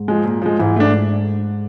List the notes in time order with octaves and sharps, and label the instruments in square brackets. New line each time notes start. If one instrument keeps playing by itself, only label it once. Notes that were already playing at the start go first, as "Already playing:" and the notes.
Already playing: [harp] G#2
[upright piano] F3 G#3
A#2
F3 G#3
[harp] G#2 [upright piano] E3
[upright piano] A3 D4